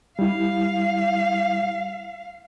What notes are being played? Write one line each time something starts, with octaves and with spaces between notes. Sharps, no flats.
G3 E4 F5